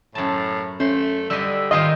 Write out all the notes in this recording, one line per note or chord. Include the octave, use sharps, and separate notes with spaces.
F#2 A2 A5
A3 C#4 C5
D3 G3 D#5 E6 B6
G#2 D#3 F4 C5 D#5